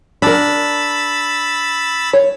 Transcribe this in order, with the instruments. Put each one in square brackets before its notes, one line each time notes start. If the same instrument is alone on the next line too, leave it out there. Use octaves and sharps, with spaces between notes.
[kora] D4 A#4 [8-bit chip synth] B5 E6 A6
[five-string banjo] C#5